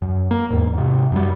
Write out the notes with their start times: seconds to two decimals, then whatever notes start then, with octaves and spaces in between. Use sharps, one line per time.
0.02 F#2
0.31 A#3
0.50 E2 G#2
0.73 G#2 C3
1.12 F#2 F#3 G3